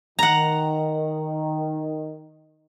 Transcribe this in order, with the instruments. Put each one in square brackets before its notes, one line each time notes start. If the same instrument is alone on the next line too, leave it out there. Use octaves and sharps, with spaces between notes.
[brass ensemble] D#3 [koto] F#5 A#5